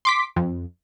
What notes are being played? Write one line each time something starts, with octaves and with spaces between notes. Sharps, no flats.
C6 D6 B6
F2